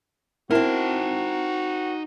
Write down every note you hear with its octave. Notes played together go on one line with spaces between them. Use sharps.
C4 D#4 E4 F#4 A#4 A5